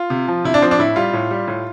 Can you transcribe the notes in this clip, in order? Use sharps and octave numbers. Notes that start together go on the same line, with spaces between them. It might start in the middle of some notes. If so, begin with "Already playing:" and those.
Already playing: F4
C3
F3
C3 E4
D4
F3 C4
D4
A2 E4
G3 F4
A2
G3
A2